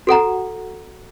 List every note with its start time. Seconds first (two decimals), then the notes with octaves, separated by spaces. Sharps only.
0.07 F#4 A4 F#5 A#5